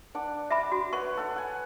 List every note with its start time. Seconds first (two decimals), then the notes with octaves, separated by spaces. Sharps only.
0.15 D4 D5 F#5
0.51 E5 B5 D6
0.72 F#4
0.93 B4 C#5 F#5 C#6
1.17 A4 F#5
1.36 F#5 G#5